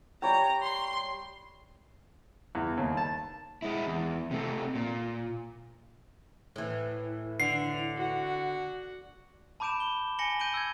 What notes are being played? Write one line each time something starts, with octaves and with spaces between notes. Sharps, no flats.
G3 C#5 G5 A#5
C6
E2
D#2
A5
G#3 E4
E2
C3 A3
A#2
A2 E3
D3 C7
F#4 F#5
A5 B5 D6 G6 D7 E7
B5 G7
G#5 A#6 C#7 F#7 G7
G6 D7 D#7 G7
E6 G6 G#6